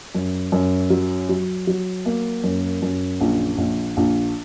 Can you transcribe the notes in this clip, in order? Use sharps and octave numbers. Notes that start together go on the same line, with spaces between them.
F#2
F#2
F#3
F#3
F#3
A#3
F#2
F#2
A#1
A#1
A#1